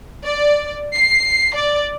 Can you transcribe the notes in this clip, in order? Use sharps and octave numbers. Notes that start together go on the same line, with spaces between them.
D5
C7
D5